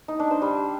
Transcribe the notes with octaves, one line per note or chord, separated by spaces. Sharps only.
D#4
D4
C5
G3